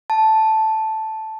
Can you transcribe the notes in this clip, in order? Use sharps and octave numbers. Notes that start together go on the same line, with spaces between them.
A5